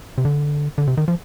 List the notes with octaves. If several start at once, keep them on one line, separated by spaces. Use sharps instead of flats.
C3
D3
D3
C3
D#3
F3